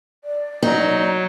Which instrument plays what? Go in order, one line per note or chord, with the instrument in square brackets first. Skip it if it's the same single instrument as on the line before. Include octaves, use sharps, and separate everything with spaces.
[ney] D5
[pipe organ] F#3 [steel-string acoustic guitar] D#4